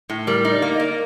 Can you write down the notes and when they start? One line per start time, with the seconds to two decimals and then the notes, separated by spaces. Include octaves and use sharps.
0.10 A2
0.27 G3 A#4
0.45 D#4
0.51 D5
0.62 A#3
0.74 D#5
0.80 A#3